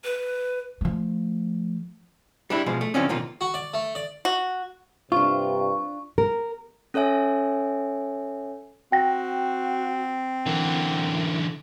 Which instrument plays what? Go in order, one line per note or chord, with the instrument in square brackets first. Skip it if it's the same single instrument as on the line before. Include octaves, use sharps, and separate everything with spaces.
[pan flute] B4
[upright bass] F3 A3
[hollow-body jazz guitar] G3 D4 E4
B2 F3 G#3
A3
D3 F3 C4 C#4 D#4
B1 D#3 A#3 F4
[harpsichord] F#4
D5
A3
D5
[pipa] F#4
[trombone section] G2 C3 [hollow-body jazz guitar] D4 F4 [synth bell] C#6
[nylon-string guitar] A#4
[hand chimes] C#4 A4 C#5 E5 G#5
[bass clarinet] C4 [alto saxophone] F#4 [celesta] G5 A#6
[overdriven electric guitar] D3 E3 [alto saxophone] A#4